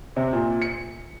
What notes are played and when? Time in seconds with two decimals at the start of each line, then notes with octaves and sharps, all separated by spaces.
0.16 C3
0.33 A#2
0.62 C#7